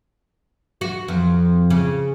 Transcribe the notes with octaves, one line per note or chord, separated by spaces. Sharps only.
F#4
F2
C#3